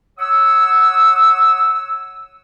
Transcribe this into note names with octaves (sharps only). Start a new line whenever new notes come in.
C#5 F#5 D#6 E6